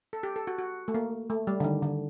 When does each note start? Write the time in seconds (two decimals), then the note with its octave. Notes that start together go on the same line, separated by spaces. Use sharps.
0.13 A4
0.23 G4
0.36 A4
0.47 F#4
0.58 F#4
0.88 A3
0.94 A#3
1.30 A3
1.47 G3
1.60 D3
1.64 D#3
1.82 D3